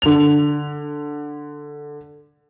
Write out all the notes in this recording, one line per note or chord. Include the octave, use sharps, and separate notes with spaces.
D3 F7